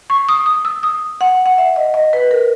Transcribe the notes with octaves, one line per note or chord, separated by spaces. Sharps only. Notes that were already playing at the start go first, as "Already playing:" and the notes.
C#6
D#6
D#6
E6
D#6
F#5
F#5
E5
D#5
D#5
B4
A#4